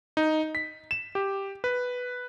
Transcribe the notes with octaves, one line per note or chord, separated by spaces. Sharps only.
D#4
B6
E7
G4
B4